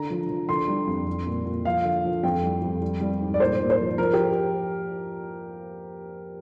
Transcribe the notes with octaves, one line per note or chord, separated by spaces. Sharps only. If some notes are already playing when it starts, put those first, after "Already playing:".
Already playing: D3 A#5
F3
F3
D3 C6
G3
F2
G3
A#2
A#2
F3 F5
D3
F3
F2 G5
G3
F2
G3
G3
G#2
D5
A#2 C5
A#2
C5
F3
F3 A#4
G4